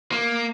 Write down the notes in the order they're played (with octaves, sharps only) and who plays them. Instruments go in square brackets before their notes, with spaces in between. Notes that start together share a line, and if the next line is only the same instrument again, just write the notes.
[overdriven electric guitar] A#3